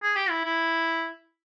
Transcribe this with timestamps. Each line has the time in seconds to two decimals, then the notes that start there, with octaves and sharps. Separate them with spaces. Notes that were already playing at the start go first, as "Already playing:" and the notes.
0.02 G#4
0.16 G4
0.30 E4
0.44 E4